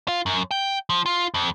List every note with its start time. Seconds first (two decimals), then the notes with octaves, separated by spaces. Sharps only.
0.08 F4
0.26 F#2
0.51 G5
0.90 F3
1.06 F4
1.34 F2